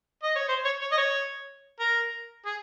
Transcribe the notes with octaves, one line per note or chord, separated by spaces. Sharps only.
D#5
C#5
C5
C#5
C#5
D#5
C#5
A#4
G#4